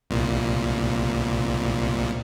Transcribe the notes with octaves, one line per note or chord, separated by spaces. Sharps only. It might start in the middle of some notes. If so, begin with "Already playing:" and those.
C2 A#2